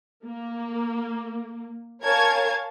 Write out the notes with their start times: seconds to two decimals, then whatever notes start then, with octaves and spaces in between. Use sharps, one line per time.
0.25 A#3
2.03 A#4 C#5 F5 G#5 A5 G#6